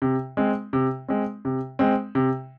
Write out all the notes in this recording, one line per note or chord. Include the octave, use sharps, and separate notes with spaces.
C3
G#3 C4
C3
G#3 C4
C3
G#3 C4
C3